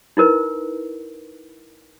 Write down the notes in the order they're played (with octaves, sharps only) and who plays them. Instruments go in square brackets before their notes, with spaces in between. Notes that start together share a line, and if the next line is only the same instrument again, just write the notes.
[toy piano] D#4 E4 A#4 B4